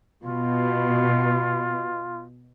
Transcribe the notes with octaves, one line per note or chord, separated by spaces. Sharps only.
B2 F4